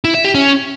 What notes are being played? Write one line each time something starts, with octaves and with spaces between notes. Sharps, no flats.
E4
E5
G4
C#4